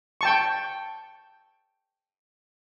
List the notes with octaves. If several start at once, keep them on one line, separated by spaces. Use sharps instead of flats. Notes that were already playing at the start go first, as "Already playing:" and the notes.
G5 A5 C#6